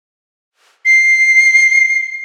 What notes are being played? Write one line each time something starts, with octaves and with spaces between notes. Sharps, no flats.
C7